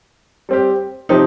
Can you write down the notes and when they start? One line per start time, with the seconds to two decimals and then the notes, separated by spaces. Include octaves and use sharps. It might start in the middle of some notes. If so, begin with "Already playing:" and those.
0.49 G3 C4 G4
1.09 C3 F3 C4 D#4 G4